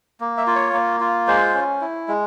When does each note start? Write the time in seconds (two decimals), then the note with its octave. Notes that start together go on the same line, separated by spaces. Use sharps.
0.20 A#3
0.38 E5
0.47 F4
0.56 C#5
0.73 A#3
1.00 F4
1.27 G#3 C5
1.54 C#4
1.81 E4
2.08 G#3